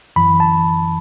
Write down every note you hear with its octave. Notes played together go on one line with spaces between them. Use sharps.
F#2 E3 B5
A5